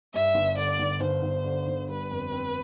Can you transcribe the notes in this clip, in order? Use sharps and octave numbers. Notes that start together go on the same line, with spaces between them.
G2 E5
G1
D3 D5
G1
G1 C5
G1
D3
G1
G3 B4
F2
C4